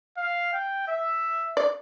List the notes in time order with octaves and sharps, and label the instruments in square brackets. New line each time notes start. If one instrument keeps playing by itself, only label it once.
[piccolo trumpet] F5
G5
E5
[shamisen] D5